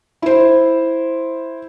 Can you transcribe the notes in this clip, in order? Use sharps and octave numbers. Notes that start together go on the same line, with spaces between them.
E4 C5